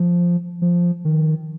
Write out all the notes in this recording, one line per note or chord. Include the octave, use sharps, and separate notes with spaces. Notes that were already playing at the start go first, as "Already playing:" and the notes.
Already playing: F3
F3
D#3